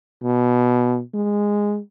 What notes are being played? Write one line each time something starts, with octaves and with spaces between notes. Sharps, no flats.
B2
G#3